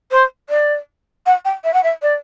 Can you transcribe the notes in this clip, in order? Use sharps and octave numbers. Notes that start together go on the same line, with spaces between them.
C5
D5
F#5
G5
E5
F#5
E5
D5